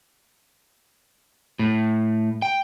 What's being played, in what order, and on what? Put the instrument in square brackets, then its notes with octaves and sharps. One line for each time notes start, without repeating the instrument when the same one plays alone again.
[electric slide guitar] A2
G5